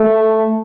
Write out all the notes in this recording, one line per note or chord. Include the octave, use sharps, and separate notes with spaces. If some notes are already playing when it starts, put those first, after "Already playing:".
Already playing: A3